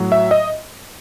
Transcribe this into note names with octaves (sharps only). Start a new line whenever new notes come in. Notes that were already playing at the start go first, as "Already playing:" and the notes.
Already playing: A2 F#3
E5
D#5